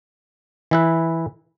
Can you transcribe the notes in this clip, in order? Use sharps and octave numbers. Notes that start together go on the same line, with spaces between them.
E3 E4 B4